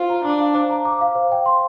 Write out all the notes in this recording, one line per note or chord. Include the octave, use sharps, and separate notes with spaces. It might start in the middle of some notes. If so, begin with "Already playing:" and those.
Already playing: F4 C5
A#5
D4 D6
F5
C5
A#5
D6
F5
C5
G5
C6